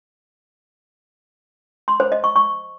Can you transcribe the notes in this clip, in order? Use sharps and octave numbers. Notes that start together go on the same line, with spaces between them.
C6
C5
D#5
C#6
C#6